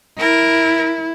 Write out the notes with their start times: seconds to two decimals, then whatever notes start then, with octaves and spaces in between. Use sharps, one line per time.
0.18 E4 A#4